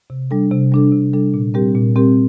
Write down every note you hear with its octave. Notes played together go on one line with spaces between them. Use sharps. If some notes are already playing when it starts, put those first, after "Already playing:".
C3
G3 D4 A4
C3
G3 D4 A4
C3
G3 D4 A4
A#2
G3 C4 G4 A#4
A#2
G3 C4 G4 A#4